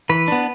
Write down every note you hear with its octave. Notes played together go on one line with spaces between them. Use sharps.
E3 B4
B3 D4